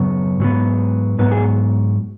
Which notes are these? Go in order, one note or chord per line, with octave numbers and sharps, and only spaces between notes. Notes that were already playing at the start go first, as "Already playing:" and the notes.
Already playing: F#2 C#3 F#3 B3 C#5
G#2 F#3 B3
G#2 F#3 B3 B4
G#4